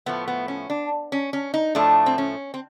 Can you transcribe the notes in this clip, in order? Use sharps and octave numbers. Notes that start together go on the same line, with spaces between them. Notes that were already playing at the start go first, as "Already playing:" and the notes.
A2 F3 A3 B3
B3
C#4
D4
C#4
C#4
D#4
A2 F3 A3 D4
C4
C#4
C4